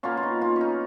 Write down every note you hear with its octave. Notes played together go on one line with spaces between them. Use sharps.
B2 A#3 C#4 F4
F4
D#4
C#4 F4
C#4 D#4